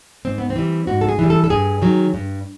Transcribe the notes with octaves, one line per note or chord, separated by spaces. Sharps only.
G#2 C4
B3
C4
E3 G3
G#2 F#4
A4
G#4
E3 G3
A4
A4
G2 G#4
D#3 F#3
G2